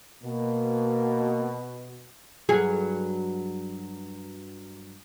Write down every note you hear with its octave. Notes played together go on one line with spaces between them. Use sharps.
B2 A#3
G2 F#3 G#4